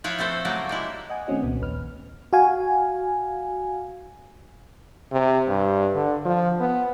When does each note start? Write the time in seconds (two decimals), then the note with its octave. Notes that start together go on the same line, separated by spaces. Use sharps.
0.04 F3 E4 B4 C#5 F5
0.19 A3 C4 A4 C5
0.45 C#3 F#3 A3 A#3
0.69 G3 G#3 E4
1.10 D#5 F#5 G#5
1.27 D#3 A3 C4 C#4 F#4 D#5
1.42 C2 A#2 B3
1.61 A#1 D#2 B4 F6
2.33 F#4 F5 G#5
5.12 C3
5.48 G2
5.95 D3
6.25 F3
6.60 B3